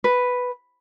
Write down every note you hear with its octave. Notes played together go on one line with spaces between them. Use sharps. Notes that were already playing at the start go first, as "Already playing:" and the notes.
B4